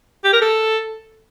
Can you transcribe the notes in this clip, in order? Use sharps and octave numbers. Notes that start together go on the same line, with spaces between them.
G4
A#4
A4